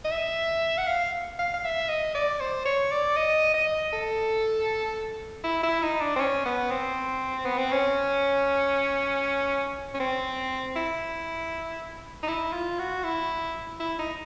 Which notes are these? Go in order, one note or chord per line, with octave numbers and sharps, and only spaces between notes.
D#5
E5
F#5
F5
F5
F5
E5
D#5
D5
C5
C#5
D5
D#5
D#5
A4
E4
E4
D#4
D4
C4
C#4
B3
C4
B3
C4
C#4
C#4
C4
E4
D#4
E4
F4
F#4
E4
E4
D#4